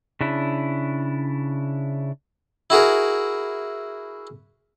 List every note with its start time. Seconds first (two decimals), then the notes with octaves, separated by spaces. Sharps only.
0.21 C#3 D4 E4
2.70 E4 F#4 G#4 A#4